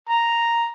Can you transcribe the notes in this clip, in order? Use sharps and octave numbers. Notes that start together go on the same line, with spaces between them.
A#5